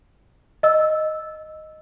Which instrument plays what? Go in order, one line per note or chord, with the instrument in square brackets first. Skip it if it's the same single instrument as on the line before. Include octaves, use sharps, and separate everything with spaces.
[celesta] D#5 E6